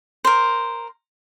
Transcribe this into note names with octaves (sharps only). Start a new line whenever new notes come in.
A#4 C5